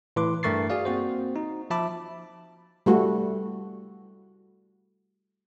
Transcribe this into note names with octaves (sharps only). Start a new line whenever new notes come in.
A2 E3 B4 C6 D6
G2 A3 A#4 C#6 A6 C7
F#4 G#4 D5 F5
A#3 C4 F#4 C5
D#4
F3 E5 A5 B5 D6
G3 A3 F#4